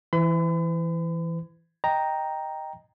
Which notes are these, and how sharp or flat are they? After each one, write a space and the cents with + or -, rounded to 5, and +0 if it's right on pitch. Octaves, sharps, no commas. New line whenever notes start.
E3 +0 B4 +45 B5 +45
D#5 +0 G5 +0 A#5 +0